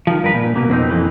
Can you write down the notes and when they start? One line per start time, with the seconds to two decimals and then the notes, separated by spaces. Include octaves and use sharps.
0.07 D#3 F3
0.22 G2 A#4 B4
0.35 A#2
0.56 B2 A#3
0.69 F2 B2 A#3 C4 D#4
0.90 F2 E3